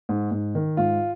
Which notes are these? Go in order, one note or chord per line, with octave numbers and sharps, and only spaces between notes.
G#2
G#2
D#3
G#2 F4